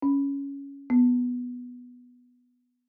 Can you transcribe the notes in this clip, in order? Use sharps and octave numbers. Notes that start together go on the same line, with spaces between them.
C#4
B3